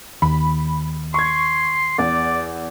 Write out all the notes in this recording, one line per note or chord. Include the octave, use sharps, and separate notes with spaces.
D#2 B5
C6 C#6 G#6
E2 D5